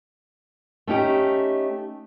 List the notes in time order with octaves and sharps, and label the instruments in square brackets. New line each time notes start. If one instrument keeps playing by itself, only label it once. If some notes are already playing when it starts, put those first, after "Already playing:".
[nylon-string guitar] A3 C#4 D#4 G4